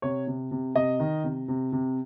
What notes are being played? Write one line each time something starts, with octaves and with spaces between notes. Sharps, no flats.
C3 C#5
C3
C3
C3 D#5
D#3
C3
C3
C3